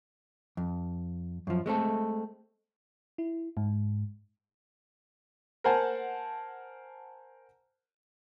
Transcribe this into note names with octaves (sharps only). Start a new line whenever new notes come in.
F2
F#2 F3
G#3 A3 C4 A4
E4
G#2
A#4 C5 F#5 G#5 A5